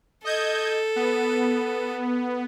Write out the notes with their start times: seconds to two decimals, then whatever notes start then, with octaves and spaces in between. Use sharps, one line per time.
0.25 A4 D#5 G6 G#6
0.96 B3